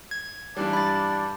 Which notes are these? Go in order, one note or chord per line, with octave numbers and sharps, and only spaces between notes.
G#6
G2 E3 G3 D4
B5 A6